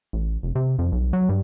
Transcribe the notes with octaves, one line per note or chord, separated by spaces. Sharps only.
A1
F1
C3
F2
B1
F#3
G2